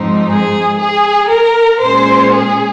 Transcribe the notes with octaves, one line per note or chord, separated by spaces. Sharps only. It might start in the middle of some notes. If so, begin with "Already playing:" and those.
Already playing: G#2 F3 C4 D#4
G#4
G#4
A#4
A#2 G#3 C#4 C5
G#4